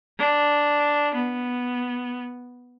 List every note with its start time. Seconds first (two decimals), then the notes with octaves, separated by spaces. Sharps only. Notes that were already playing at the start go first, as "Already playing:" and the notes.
0.18 D4
1.15 B3